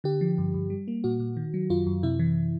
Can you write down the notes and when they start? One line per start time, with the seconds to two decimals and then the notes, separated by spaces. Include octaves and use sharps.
0.04 D3 G4
0.21 F3
0.38 G2
0.54 G2
0.70 G3
0.88 A#3
1.04 A#2 F#4
1.20 A#2
1.37 D#3
1.54 F#3
1.70 F#2 F4
1.87 F#2
2.03 C3 E4
2.19 E3